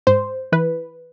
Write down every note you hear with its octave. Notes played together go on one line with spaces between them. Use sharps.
G#2 C5
E3 B4